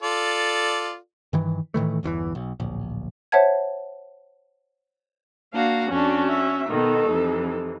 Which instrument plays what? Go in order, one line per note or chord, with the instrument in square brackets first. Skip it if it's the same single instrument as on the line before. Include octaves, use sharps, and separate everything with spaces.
[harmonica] F4 A4 D5
[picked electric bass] G2 D#3 E3
A2 D#3 E3 A3
G1 E2 D#3 E3
B1
D1 A#1
[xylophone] C5 C#5 E5 F#5 A5 G#6
[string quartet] A#3 D4 F#4 [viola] F5
[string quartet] F2 D4 [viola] C#4 F#4
[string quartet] E5
[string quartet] B2 D#3 B3 [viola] D#4 A4
[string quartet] F2 C3 E3